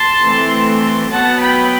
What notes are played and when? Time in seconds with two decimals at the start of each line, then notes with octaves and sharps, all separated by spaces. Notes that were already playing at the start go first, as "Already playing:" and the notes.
Already playing: A5 C6
0.23 E3 A3 C4
1.12 F#3 B3 F#5 A5
1.41 G5 B5